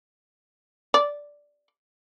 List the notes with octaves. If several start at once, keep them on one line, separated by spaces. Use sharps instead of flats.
D5